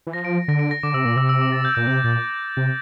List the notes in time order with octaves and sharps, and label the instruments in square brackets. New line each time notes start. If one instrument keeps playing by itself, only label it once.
[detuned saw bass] E3
[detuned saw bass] F3 [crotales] A#6
[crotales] D7
[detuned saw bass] D3 [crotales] A#6
[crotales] D7
A#6
[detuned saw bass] D3 [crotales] D6
[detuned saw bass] C3 [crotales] E6
[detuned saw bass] A#2 [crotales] D6
[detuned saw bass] C3 [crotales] E6
[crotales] E6
D6
A6
G6
[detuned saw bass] A#2 [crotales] E6
[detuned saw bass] C3 [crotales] G6
[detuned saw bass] A#2 [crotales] A6
[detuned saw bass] C3